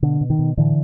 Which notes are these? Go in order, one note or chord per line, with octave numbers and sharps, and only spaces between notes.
B2 D3
B2
D#3
B2
A2 D3 E3